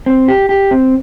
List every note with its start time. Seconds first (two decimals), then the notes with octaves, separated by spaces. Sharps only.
0.06 C4
0.28 G4
0.49 G4
0.71 C4